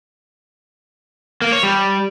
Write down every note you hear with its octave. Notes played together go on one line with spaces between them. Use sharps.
A#3
C#5
G3